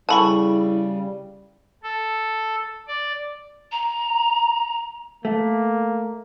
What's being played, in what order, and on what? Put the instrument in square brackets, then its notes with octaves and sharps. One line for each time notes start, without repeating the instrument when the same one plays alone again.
[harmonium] C#3 G3 [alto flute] E4 [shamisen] A4 A5 [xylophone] G#5 B5 C#6
[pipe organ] A4
D5
[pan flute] A#5
[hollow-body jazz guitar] A3 [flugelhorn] A#3